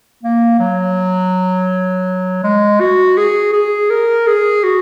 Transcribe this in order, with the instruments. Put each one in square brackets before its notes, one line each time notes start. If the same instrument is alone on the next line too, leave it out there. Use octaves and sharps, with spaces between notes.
[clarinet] A#3
F#3
G#3
F#4
G#4
G#4
A#4
G#4
F#4